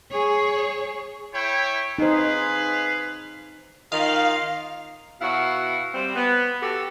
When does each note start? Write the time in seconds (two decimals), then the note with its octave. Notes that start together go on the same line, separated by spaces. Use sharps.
0.11 G#4 C#5
1.34 E4 C#5 G5
1.99 D#4 G#4 B4 C5 F5
3.92 D#3 F4 D#5 F5
5.21 B2 E4 F#4 F5 F#5
5.94 G3 C4
6.16 B3
6.61 F#4 G4 A4